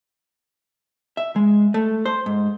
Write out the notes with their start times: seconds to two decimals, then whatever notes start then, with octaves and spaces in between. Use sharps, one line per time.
1.17 E5
1.36 G#3
1.74 A3
2.06 C5
2.26 G#2